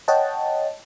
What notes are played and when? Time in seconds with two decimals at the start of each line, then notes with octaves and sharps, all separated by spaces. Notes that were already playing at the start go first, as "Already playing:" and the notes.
0.08 C#5 D#5 F#5 G5 A5